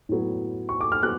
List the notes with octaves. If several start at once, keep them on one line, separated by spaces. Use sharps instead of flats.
A2 F#3 B3
C#6
D6
F6
F#3 B3 F#6